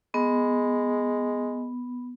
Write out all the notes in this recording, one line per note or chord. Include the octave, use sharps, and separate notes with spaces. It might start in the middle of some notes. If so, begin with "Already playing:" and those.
G#3 B3